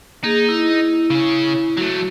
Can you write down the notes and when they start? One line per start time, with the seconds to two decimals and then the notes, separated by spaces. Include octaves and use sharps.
0.24 A#3 D#4 G#4
0.49 E4
1.10 C#3 C#4
1.77 F#3 A3 F#4